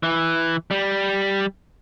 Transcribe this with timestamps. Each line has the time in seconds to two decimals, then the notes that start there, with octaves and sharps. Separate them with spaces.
0.03 E3
0.71 G3